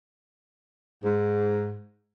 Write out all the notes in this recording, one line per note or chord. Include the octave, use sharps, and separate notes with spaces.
G#2